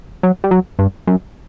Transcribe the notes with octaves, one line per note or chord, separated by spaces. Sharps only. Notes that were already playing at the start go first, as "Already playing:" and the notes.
F#3
G3
F#3
G2
F#2